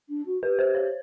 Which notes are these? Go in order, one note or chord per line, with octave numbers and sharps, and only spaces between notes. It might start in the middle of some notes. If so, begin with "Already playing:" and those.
D4
F#4
G4 B4
C5
C#5